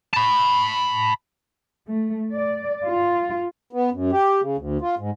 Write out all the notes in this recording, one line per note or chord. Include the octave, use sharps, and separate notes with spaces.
A5 B5
A3
D5
F4
B3
F#2
G4
C#3
D2
F4
G#2